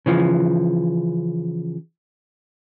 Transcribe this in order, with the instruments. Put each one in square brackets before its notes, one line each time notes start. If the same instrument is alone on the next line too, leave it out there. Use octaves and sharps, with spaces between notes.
[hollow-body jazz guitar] C#3 E3 F3